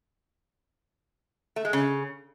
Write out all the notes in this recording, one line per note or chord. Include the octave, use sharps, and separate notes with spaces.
A3
G#3
C#3